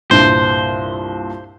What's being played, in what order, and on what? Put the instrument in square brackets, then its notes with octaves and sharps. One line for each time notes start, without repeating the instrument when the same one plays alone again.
[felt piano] C2 G2 A#2 [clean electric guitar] C5